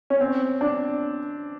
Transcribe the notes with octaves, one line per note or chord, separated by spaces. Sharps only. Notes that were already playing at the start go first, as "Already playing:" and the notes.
C#4
C4
D4